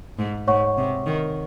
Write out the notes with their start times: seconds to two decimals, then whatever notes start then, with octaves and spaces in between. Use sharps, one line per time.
0.18 G#2
0.47 G#2 C#5 F#5 C#6
0.77 C3
1.06 D#3